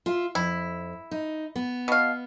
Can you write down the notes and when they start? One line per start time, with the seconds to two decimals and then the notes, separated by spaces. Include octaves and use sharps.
0.06 F4 E5
0.35 F2 E4
1.11 D#4
1.56 B3
1.88 B2 F5